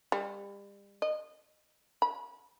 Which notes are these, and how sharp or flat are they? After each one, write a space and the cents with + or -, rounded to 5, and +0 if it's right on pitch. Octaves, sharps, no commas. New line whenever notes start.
G3 +35
D#5 -25
B5 -35